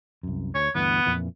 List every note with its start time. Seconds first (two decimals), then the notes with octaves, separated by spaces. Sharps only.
0.23 C2 F#2
0.55 D2 C#5
0.75 D2 G2 E3 B3
1.06 F2 A#2 E3